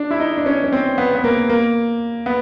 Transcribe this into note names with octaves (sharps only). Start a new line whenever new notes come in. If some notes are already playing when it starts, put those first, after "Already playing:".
Already playing: D4
E4
D#4
D4
C#4
C#4
C4
B3
B3
A#3
A#3
B3